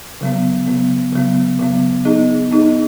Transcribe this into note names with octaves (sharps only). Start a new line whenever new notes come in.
C#3 F#3 B3
C#3 F#3 B3
C#3 F#3 B3
C#3 F#3 B3
B3 D#4 G#4 D#5
B3 D#4 G#4 D#5